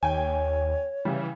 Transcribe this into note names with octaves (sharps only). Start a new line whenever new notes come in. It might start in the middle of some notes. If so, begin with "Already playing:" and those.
D#2 C#5 G5 G#5
C#3 E3 G3